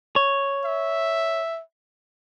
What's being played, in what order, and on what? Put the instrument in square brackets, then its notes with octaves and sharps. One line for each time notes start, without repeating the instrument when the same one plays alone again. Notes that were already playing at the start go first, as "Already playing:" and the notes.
[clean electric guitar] C#5
[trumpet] E5